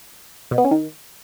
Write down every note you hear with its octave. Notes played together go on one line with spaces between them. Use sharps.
B2
B3
C#4
D#3